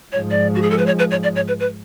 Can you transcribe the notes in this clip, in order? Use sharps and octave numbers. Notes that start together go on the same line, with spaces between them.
G#2 F3 G#3 C#5
D5
F#4
G#4
A4
B4
C#5
B4
C#5
D5
C#5
B4
B4